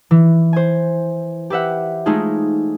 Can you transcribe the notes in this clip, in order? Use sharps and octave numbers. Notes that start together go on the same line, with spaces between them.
E3
C5 G#5
G4 B4 E5 F#5
G#3 A3 D#4 F4 G#4